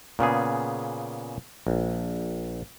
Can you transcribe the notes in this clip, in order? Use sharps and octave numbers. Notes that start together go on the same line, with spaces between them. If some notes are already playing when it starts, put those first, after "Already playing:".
A#2 C#3 B3 G#4
A#1